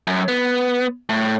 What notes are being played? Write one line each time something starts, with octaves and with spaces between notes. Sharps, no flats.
F#2
B3
A2